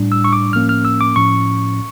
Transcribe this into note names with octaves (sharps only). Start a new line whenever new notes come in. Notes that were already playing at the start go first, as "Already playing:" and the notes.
Already playing: A2 G3 D4
E6
C#6
D6
A2 F3 A#3 C#4 F6
F6
E6
D6
A2 F3 C#4 C#6